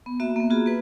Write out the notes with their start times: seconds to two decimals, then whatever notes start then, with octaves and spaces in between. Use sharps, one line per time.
0.06 B3
0.20 A#3 F#4 E5
0.36 A#3 B3
0.50 F4 F#4 G#4 B5
0.66 A#3 B4